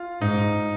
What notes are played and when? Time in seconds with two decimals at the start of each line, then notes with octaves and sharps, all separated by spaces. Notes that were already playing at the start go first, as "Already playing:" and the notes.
Already playing: F4
0.21 G#2 D#4